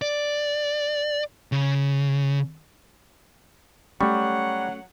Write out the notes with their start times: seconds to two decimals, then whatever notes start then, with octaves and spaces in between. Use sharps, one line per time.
0.02 D5
1.52 C#3
4.01 F#3 G3 A3 C#4 F#5 C#6